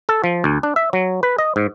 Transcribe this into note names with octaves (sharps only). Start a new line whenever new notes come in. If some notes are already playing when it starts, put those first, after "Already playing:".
A4
F3
D2
D4
E5
F#3
B4
D#5
G#2